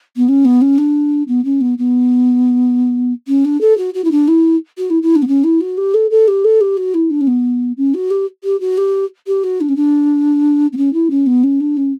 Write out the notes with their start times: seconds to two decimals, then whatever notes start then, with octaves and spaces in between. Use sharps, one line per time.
0.16 B3
0.28 C#4
0.44 B3
0.61 C#4
0.78 D4
1.27 B3
1.44 C#4
1.60 B3
1.78 B3
3.27 C#4
3.44 D4
3.60 A4
3.77 F#4
3.94 F#4
4.04 E4
4.11 D4
4.27 E4
4.77 F#4
4.90 E4
5.02 E4
5.15 D4
5.22 B3
5.27 C#4
5.43 E4
5.60 F#4
5.77 G4
5.94 A4
6.10 A4
6.27 G4
6.44 A4
6.60 G4
6.77 F#4
6.94 E4
7.10 D4
7.20 C#4
7.27 B3
7.77 C#4
7.94 F#4
8.10 G4
8.43 G4
8.60 F#4
8.77 G4
9.27 G4
9.43 F#4
9.60 D4
9.68 C#4
9.76 D4
10.72 B3
10.77 C#4
10.93 E4
11.10 C#4
11.26 B3
11.43 C#4
11.60 D4
11.76 C#4